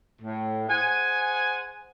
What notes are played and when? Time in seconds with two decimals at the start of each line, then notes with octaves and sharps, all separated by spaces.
0.22 A2
0.69 G#4 C5 F#5 G#5